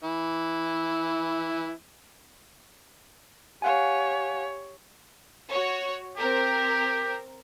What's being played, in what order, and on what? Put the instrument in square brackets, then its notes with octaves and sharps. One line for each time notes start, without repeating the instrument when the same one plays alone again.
[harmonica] E3 E4
[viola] G4 C#5 [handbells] F5 F#5 G#5
[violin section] F#4 C#5
[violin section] C4 A#4 [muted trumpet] G4